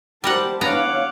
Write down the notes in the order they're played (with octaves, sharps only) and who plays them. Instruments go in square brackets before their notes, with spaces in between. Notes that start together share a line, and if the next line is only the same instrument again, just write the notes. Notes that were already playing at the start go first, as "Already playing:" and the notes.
[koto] G3 A#4 F#5 [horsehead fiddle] G4 C5 [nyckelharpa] A5
[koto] B3 D4 A#5 [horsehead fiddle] C#5 F5 [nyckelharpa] F#5 D6